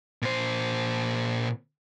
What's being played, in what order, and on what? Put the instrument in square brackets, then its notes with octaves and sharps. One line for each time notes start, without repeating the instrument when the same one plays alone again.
[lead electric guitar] A#2 C5